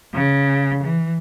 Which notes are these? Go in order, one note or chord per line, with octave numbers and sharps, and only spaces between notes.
C#3
E3